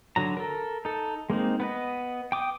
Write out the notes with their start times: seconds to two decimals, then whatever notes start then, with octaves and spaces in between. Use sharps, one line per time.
0.16 D3 F#3 A#5
0.37 A4 A#4
0.85 D#4 A4
1.30 G#3 A#3 C4 D#4
1.60 B3 B4 D#5
2.32 G5 D6 D#6